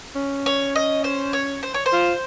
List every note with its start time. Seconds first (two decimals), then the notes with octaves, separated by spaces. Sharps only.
0.16 C#4
0.46 C#5
0.75 D#5
1.04 C5
1.33 C#5
1.63 C5
1.74 C#5
1.86 C5
1.93 F4